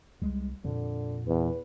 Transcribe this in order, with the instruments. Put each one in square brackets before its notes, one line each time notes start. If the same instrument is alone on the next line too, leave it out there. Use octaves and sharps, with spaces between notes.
[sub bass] C2 [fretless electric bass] G3 G#3
[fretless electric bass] F2 [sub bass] A#2 [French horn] D3
[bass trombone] E2 [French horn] B4